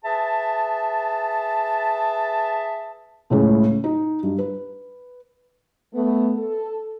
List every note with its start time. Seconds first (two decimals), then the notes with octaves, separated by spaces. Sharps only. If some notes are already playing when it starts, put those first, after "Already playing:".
0.04 G#4 B4 E5 A5
3.30 C#2 A2 C#3
3.84 D#4
4.23 G2
4.38 B4
5.95 A3 B3
6.37 A4